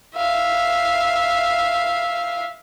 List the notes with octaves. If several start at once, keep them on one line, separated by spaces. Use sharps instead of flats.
E5 F5